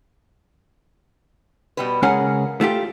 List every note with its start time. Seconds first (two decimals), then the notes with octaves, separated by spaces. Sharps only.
1.77 B2 G3 B4
2.03 C#2 C#3 C#4 G#4 A#4 F#5
2.61 A3 F4 G4